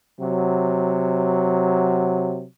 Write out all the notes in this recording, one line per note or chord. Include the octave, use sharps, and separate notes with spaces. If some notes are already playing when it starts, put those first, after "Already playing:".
C3 F#3